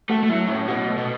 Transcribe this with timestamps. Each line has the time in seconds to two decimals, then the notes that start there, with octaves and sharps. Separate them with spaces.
0.09 A3 F#4 F#5
0.24 A3
0.29 F#3 E4 E5
0.48 A2 C#4 C#5
0.68 B2 F#4
0.88 A3 A4
0.98 B2